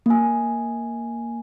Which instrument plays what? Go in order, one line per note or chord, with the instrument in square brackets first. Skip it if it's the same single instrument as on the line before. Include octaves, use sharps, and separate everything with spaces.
[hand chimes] A#3 G#5